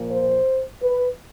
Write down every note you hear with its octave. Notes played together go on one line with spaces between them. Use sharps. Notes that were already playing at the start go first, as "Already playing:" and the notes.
Already playing: A#2 F3 A#3
C5
B4